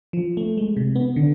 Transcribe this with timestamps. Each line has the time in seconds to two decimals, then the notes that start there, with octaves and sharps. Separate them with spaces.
0.13 F3
0.37 A3
0.57 G#3
0.77 C3
0.95 B3
1.16 D3